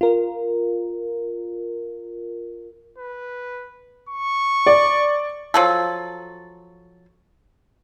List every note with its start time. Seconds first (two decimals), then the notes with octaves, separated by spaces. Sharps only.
0.01 F4 A#4
2.98 B4
4.09 C#6
4.66 D5
5.54 F3 F#3 A4